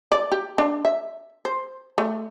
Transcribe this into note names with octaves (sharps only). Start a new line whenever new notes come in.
D5
G4
D4
E5
C5
A3